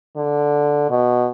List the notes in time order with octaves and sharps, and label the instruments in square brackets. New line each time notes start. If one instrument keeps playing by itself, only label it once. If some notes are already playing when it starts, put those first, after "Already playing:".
[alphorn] D3
B2